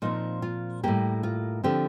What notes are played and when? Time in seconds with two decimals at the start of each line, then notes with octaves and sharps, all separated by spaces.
0.02 A#2 F3 C4 D#4
0.42 F4
0.83 A2 G3 A#3 G4
1.23 F4
1.64 D3 F3 C4 G4